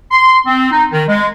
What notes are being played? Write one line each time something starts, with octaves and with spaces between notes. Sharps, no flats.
C6
C4
D#4
D#3
G#3